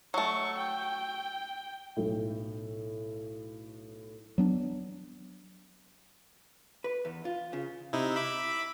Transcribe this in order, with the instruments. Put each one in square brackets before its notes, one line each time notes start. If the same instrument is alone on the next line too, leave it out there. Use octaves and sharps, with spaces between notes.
[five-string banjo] F#3 A3 [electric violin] C#6
[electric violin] G5
[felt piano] B1 A2
[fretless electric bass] F#3 B3 D4
[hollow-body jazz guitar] B4
E2
F4
C#3
[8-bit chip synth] C3 D#4 E4
E5 B5 D6